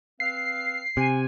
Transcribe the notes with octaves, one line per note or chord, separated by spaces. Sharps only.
C4 B4 F5 C7
C3 G#5